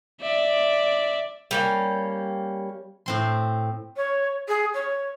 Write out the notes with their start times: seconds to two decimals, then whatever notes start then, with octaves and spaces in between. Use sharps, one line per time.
0.21 D5 E5
1.51 G3 A#3 C#4
3.06 A2 C4 C6
3.96 C#5
4.48 G#4
4.74 C#5